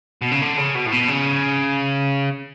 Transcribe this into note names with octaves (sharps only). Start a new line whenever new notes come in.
B2
C#3
D3
C#3
B2
A2
B2
C#3